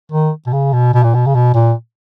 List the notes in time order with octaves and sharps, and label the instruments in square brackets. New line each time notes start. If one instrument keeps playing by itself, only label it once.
[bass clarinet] D#3
B2
C#3
B2
B2
A#2
B2
C#3
B2
A#2